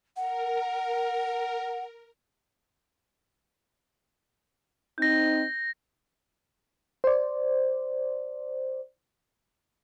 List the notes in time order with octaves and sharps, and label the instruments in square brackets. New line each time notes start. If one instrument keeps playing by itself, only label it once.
[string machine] A#4 [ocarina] F#5
[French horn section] C4 D#4 [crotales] G6 A#6
[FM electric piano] C5 D5